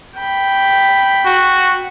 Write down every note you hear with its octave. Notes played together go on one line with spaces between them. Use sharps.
G5 B5
F#4